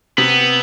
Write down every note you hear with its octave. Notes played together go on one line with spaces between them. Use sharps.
C3 B3